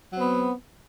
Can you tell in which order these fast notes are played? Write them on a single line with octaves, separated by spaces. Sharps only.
F#3 C4 B3